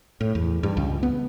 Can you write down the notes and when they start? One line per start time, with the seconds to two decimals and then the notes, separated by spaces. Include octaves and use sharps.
0.21 A2
0.35 E2
0.63 G2
0.77 C#2
1.03 B3